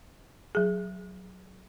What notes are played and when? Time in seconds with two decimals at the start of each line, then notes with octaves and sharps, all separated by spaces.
0.55 F#3 G#4